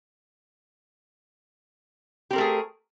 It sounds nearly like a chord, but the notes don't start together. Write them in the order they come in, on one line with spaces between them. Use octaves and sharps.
G4 C4 A#4 A3 G#4